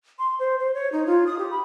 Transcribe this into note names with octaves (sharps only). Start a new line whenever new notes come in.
C6
C5
C5
C#5
D#4
F4
D#6
G4
B5